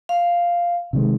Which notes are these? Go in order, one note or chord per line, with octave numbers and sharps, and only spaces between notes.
F5
C3 D#3 G#3